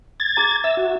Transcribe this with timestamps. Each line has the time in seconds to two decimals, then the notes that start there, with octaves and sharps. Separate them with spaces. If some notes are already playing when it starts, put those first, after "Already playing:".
0.20 G#6 A6
0.37 G#4 A#5
0.64 E5 E6
0.77 F#4